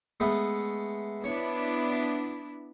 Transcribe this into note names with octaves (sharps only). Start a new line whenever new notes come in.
G#3 A3 B3
B3 D4 E4 C#5